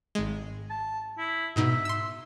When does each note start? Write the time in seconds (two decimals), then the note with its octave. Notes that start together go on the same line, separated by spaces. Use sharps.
0.15 G#1 G#3
0.70 A5
1.18 E4
1.56 G#2 B2 D#4 E5
1.85 C6 E6